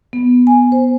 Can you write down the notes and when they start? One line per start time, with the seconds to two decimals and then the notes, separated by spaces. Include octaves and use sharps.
0.13 B3
0.47 G#5
0.72 C5